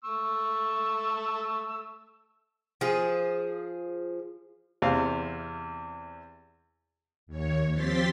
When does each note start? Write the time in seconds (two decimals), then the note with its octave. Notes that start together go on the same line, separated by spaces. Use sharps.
0.04 A3 C#6 E6
2.81 F3 G#4
4.82 E2 C3 F5
7.27 D#2 C#5
7.73 F3 C4 G4 C6 A6 B6